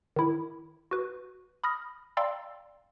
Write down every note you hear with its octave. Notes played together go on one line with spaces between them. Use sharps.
D#3 E4
F#4 B4
B5 D#6 F6 A#6
D5 F5 G5 A#5 C6 E6